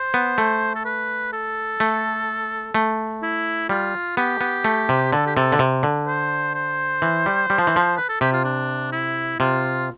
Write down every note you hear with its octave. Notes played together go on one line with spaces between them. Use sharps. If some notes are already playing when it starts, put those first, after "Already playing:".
Already playing: C5
B3
A3
A4
B4
A4
A3
A3
E4
G3 F4
B3 G4
B3
A3
C3
D3 A4
G4
C3 A4
D3
C3
D3
C5
C5
E3
G3
G3
F3
E3
F3
B4
A4
C3 G4
F4
D4
E4
C3 F4